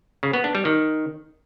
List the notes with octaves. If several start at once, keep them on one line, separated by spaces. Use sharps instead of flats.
C#3
B3
D4
G3
D#3